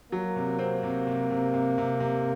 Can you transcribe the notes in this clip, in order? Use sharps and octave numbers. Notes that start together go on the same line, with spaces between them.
F#3 A#3
C3
C4
C3
C3
C3
C3
C3
C3